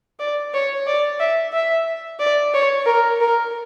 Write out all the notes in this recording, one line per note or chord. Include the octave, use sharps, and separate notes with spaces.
D5
C#5
D5
E5
E5
D5
C#5
A#4
A#4